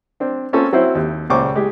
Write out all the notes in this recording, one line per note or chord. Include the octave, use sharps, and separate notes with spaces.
C4 D4
A#3 C4 C#4 F4 A4
F#3 C4 E4 C5 C#5
D#2
C#2 A#2 C5 C#6 D6
G#3 G4